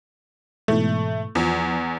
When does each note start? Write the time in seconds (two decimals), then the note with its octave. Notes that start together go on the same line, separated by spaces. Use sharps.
0.68 G#2 B2 E3 A3
1.35 E2 F3